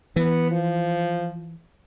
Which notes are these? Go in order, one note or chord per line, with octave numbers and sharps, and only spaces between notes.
E3 B3
F3